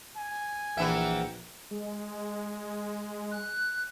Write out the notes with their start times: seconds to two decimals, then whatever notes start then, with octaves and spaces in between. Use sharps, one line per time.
0.17 G#5
0.77 A#1 E3 A#4 E5 F#5 G5
1.71 G#3
3.31 F#6